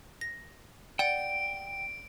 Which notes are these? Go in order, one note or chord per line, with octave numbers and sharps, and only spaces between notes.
A#6
D5 F#5 G5 D7